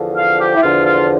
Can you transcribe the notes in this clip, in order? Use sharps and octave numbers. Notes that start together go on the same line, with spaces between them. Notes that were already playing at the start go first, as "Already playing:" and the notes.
Already playing: E2 D3 F3
F5
G4
E4
E2 D3 F3 F4
F4